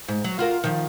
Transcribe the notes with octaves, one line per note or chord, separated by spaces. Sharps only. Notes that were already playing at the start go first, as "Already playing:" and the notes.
G#2
F#3
F4 F#4 A#4
D#3 F3